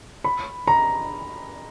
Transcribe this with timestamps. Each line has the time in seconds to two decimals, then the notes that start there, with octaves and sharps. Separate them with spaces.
0.24 B5
0.67 A#5